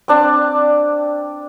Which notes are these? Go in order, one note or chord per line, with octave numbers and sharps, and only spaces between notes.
C4 D4 A5